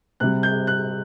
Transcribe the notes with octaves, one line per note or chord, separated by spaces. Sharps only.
C3 G3 F#6
G6
F#6